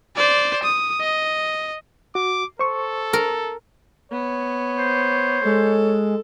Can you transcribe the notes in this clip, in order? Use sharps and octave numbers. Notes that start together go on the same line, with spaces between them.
C5 D5
D#6
D#5
F#4 D6
A4 C5 C#6
A#4
B3 C#5
C5
G#3 A4